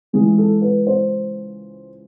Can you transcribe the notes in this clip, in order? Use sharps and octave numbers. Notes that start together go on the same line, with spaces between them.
C#2 C#3 E3 G#3 G#4
A4
B4
C5